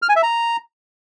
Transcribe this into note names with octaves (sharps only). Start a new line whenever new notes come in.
F6
G#5
E5
A#5